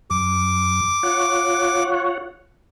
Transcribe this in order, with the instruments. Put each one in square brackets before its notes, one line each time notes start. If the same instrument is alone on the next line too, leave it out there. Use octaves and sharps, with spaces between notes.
[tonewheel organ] F#2 [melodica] D6
[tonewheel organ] F4 C#5 F#5